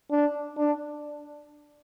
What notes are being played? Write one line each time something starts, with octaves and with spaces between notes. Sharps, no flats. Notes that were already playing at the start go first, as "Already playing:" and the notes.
D4
D4